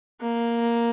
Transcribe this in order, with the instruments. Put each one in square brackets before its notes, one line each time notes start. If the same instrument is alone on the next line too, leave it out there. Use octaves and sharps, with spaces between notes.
[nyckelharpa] A#3